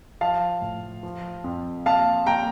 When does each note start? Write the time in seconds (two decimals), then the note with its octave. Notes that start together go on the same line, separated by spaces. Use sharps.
0.21 F3 F5 A5
0.62 A2
1.03 F3
1.44 F2
1.86 A#2 F5 A5
2.26 A#2 G5 A#5